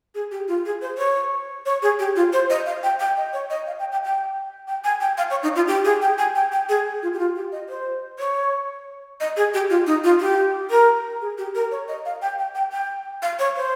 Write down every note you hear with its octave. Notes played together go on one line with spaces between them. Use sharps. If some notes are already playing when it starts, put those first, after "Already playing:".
G#4
G4
F4
G#4
C5
C#5
C#5
G#4
G4
F4
C5
D#5
F5
G5
G5
D#5
C#5
D#5
F5
G5
G5
G5
G5
G#5
G5
F5
C#5
D#4
F4
G4
G#4
G5
G#5
G5
G5
G#4
F4
G4
F4
G4
D#5
C5
C#5
D#5
G#4
G4
F4
D#4
F4
G4
A#4
G#4
G4
A#4
C#5
D#5
F5
G5
G5
G5
G5
F5
C#5
C5